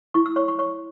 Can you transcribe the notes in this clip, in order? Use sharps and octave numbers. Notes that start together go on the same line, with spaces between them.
E4 C#6
E6
C#5 C#6
C#6
C#5 C#6